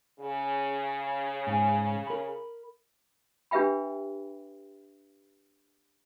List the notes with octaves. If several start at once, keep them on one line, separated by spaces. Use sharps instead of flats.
C#3
G#2 G#5
A#4 B5
D4 G4 B4 E5 G5 B5